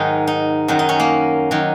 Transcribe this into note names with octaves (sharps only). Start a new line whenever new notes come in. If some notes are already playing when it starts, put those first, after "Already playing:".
Already playing: G#2 D#3 F#3 D#4
D#4
F#2 D#3 F#3
D#4
C#4
A#3
D#3 F#3